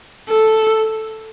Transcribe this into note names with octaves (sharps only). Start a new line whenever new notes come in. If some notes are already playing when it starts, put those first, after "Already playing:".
A4